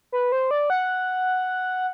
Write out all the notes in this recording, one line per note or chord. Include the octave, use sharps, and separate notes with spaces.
B4
C5
D5
F#5